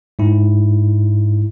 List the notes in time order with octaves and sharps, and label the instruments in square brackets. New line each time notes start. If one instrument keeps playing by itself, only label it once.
[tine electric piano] G#2 E4